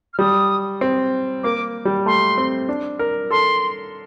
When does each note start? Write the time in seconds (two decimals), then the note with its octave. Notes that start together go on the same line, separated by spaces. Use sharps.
0.13 F6
0.18 G3 D#6
0.81 C4
1.43 A#3 D6
1.85 G3
2.06 A3 C6
2.38 C4
2.69 D4
2.99 A#4
3.30 A4 C6